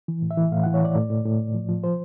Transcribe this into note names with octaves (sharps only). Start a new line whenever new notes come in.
E3
A2
E5
E3
A2 F5
F#5
E3
C#5
E3 D5
A2
A2
A2
A2
F3
F3
F3 C5